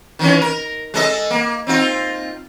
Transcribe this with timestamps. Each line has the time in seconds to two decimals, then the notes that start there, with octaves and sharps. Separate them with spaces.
0.19 D#3 E3 C#4
0.41 A#4
0.94 G#3 A4 D#5
1.30 A#3
1.67 C4 D#4 F4